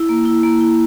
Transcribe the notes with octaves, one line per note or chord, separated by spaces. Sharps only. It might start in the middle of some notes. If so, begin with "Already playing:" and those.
Already playing: E4
A#3
E4
A#3
E4